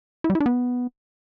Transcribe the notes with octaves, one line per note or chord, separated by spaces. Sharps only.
E4
G3
E4
D4
B3